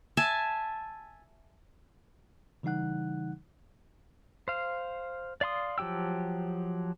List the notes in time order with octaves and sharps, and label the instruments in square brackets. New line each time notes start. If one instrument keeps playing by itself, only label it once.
[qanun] E5 G#5 A5
[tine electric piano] C#3 E3 G3 D#4 F#5 F#6
[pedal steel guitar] C5 F5
D5 F5 C6 D#6
F3 F#3 G4 G5 E6